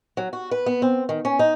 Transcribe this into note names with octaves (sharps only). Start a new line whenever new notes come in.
F#3
F#4
B4
B3
C4
D#3
C#4
D#4